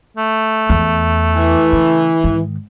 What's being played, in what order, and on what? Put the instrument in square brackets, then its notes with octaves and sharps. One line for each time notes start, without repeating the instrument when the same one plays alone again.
[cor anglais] A3
[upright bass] E2
[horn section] E3
[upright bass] C#3
G#2 D#3